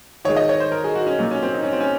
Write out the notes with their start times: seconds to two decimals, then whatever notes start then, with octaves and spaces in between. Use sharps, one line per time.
0.25 D#3 G#3 C#5
0.37 D#5
0.49 C#5
0.60 C5
0.72 A#4
0.84 G#4
0.95 F#4
1.07 C#4
1.19 A#2 F#3 A#3 D#4
1.31 C#4
1.43 C4
1.54 D#4
1.63 C#4
1.73 C4
1.81 C#4